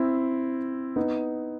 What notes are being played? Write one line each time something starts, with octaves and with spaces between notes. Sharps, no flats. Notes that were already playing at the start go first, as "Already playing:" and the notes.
Already playing: C4 E4
B3 D#4